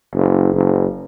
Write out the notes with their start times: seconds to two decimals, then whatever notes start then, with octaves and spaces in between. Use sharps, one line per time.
0.15 F#1
0.54 F#1